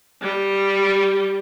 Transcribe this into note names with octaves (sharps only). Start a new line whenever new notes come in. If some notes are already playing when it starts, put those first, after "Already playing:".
G3